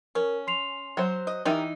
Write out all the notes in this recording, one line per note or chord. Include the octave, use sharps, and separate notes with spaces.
C#4 A#4
C6 C7 F7
F#3 C5
D#5
D#3 E3 G3 D#4 A#4